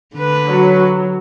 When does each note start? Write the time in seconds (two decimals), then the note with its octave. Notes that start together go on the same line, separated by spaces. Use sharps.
0.15 D3 B4
0.47 F#3